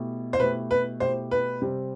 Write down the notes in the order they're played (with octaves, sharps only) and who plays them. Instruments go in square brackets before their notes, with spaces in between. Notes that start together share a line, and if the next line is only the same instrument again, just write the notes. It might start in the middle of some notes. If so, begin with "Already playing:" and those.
Already playing: [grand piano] B2 A3 E4 G4
[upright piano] C5
[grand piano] B2 A3 E4 G4 [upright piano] B4
[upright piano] B4
[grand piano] B2 A3 E4 G4 [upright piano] C5
[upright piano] B4
[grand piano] C3 G3 C4